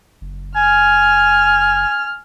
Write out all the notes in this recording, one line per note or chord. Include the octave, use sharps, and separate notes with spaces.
F#1
G#5 F6